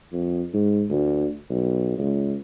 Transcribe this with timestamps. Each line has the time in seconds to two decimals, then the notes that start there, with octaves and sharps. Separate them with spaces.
0.13 F2
0.54 G#2
0.90 D2
1.50 B1
1.98 C#2